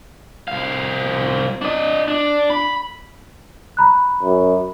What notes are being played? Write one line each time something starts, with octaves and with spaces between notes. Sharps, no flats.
C2 F5
D4 D#5
D4
B5
A#5 B5 F#6
F#2